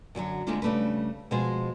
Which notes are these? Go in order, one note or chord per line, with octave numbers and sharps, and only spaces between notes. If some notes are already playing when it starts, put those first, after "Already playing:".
F#2 D3 F3 F#3
D2 G#3 A3 D4 F4
C#3 G3 A3 D4 B4
B2 F3 G#3 C5